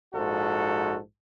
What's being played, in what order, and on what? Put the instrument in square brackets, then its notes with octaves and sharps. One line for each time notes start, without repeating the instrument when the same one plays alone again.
[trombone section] A#1 G#2 F#4 A4